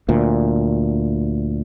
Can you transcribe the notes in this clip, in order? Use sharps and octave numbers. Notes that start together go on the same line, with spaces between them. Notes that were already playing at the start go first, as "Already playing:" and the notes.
D2 A#2